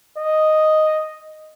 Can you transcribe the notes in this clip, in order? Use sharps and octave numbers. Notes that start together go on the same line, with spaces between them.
D#5